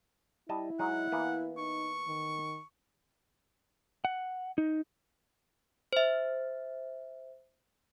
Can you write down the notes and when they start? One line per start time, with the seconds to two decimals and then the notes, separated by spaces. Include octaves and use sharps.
0.49 G3 E4 D#5 A5
0.79 F#3 G#3 D#4 F#5
1.12 E3 A#3 B3
1.58 D#4 C#6
2.07 D#3
4.05 F#5
4.58 D#4
5.93 C5 E5